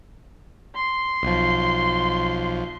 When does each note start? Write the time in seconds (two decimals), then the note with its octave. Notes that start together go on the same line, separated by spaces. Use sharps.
0.75 C6
1.23 B1 F3